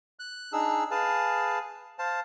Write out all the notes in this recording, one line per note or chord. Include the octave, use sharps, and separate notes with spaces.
F#6
D4 D#4 G#4 E6
G#4 B4 F5 A5
C5 F5 A5